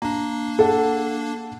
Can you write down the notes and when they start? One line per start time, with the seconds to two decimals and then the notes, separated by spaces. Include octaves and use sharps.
0.02 A#3 D4 A#5
0.59 A4 F#5